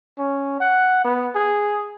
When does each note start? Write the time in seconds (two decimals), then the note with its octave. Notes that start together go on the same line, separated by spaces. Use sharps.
0.18 C#4
0.60 F#5
1.05 B3
1.35 G#4